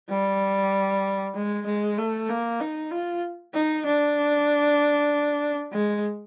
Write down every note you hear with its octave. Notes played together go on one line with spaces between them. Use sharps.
G3
G#3
G#3
A3
A#3
D#4
F4
D#4
D4
G#3